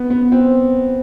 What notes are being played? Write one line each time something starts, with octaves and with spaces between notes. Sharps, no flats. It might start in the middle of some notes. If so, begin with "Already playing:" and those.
Already playing: B3
B3
C4